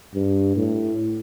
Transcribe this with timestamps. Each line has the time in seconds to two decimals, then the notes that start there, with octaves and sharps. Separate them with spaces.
0.15 G2
0.56 A2